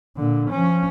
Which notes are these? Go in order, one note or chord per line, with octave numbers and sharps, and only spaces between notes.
A#2 D3
F3 C#4